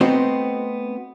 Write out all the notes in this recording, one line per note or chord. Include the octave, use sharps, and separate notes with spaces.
A3 B3 C4 D#4 F#4 C5